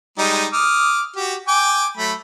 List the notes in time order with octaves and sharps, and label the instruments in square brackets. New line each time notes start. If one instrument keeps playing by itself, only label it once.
[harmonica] G3 G#3 D#4
D6 D#6 F6
F#4 G4
G5 G#5 D6
F#3 A3 B5